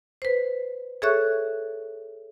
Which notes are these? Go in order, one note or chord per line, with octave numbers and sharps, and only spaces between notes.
B4 C5
G#4 A4 C#5 E5 C#6 F#6